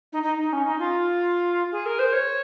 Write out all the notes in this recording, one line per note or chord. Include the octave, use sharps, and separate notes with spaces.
D#4
D#4
D#4
C#4
D#4
F4
G#4
A#4
C5
C#5